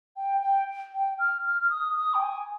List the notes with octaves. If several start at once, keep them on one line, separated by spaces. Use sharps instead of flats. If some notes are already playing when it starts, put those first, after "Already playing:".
G5
G5
G5
F6
F6
F6
D#6
D#6
G5
G#5